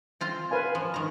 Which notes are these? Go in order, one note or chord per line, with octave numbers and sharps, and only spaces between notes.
C4 F4 C5
B4 F5 G#5
F3
D#3 A#5